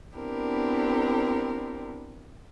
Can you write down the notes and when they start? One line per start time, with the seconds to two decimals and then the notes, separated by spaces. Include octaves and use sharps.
0.17 B3 C4 D4 E4 G4 A#4